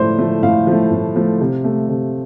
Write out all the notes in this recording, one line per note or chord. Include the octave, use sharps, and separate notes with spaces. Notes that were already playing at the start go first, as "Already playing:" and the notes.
Already playing: A2 F3 A3 C5 D5
F3 A3
A2 F5
F3 A3
A2
F3 A3
C3
A3
C3